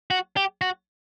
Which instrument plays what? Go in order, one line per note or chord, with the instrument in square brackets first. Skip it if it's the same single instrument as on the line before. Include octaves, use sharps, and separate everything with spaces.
[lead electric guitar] F#4
G4
F#4